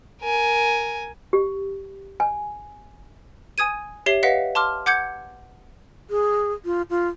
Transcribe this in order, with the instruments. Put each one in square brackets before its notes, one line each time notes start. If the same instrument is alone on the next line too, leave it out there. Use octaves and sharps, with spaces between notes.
[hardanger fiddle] A#4 G#5
[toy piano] G4
G#5
[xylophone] G#5 D#6 G#6 D#7
G4 C#5 E5 C7 G7
B4 D#5 F5 F#5 B6
A5 C6 D6 F6
F#5 D6 G6 G#6 C#7
[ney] G#4
F4
F4